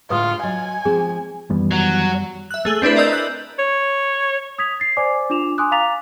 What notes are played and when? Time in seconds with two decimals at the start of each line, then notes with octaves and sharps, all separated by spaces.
0.10 A2 D3 G#3 F4 B4 D#6
0.43 F#3 D#5 G#5
0.85 F3 G#3 C4 G#4
1.50 F#2 D#3 E3 G3 B3
1.71 F#3
2.51 E5 F#6
2.65 A3 G#4 F#7 G7
2.82 C4 D4 E4 B4
2.96 A#4 D5 D#5 E6 G6
3.13 F#6 F#7
3.59 C#5
4.59 D#6 G#6 B6 F7
4.80 A6 C7
4.97 C5 D5 G#5 D6
5.30 D4 F4 D6 E7 F7
5.58 G#5 C6 D6 D#6 F#6
5.72 F5 A#5 D6 A6 B6 F7